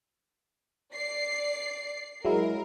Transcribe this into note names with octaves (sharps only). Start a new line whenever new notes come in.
D5 C7
F#3 G#3 E4 A#4